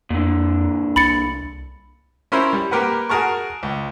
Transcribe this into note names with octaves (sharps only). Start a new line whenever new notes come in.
F2 A#2 D3
C2 B5 A6 C#7
C#4 E4 A#4 C5 E5 B5
G3
A#3 G4 A#4 B4 F#5
F#4 G#4 A#4 A5 C#6
C#2